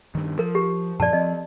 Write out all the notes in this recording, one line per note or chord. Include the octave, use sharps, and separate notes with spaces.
G2 D#3
F3 A#4
G4
F#2 A#2 F3 D5 A5
F3 C4 D#5